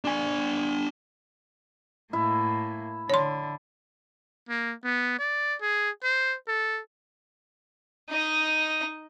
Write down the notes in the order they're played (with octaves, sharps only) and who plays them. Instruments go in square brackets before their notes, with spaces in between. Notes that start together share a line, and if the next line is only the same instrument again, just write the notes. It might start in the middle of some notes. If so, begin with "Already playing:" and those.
[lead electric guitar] D4 G#5
[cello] A2 A#3 [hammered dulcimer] E4
[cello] D3 [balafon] C#5 C6
[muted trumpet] A#3
B3
D5
G#4
C5
A4
[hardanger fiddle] D#4 D#5